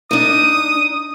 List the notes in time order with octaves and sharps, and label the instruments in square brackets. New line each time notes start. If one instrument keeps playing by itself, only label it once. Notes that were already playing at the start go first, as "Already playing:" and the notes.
[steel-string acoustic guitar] D4 D#4 [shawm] D#6 [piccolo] D#7